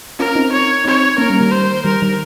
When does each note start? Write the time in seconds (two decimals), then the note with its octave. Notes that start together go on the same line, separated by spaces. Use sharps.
0.19 C#4 F4 A#4
0.35 C4 D#4
0.52 C#5
0.85 C4 D#4 C#5
1.18 A#3 C#4 A#4
1.30 G3 A#3
1.40 D#3 G3
1.51 C5
1.85 D#3 G3 A#4
2.02 D#3 G3